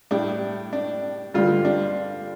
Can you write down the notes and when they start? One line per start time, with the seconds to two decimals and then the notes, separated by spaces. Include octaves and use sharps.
0.11 A2 G3 D4
0.73 D4
1.34 G2 D3 G3 F4
1.65 D4